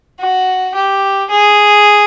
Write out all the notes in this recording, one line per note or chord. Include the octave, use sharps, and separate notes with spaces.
F#4
G4
G#4